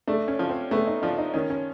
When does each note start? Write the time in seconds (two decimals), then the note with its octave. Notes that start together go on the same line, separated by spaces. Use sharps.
0.07 A3 D4
0.28 C#4
0.39 F3
0.49 C4
0.71 A3 B3
0.87 D#4
1.02 F3 D4
1.18 D#4
1.34 D#3 C#4
1.50 C#4